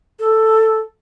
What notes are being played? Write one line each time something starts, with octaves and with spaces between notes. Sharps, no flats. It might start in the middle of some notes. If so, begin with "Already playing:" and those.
A4